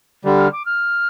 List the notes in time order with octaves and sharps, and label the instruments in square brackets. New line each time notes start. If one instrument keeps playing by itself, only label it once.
[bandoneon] D3 G3
[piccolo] F6
D6
F6